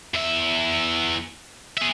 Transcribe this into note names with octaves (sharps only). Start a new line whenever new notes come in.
E2 E5
G#4 E5